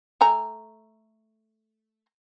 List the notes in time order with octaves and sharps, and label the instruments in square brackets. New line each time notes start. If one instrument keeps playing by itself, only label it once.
[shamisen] A3 G#5 A#5